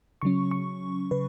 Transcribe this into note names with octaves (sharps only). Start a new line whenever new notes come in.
C#3 F#3 C#4 C#6
C#6
C#3 B4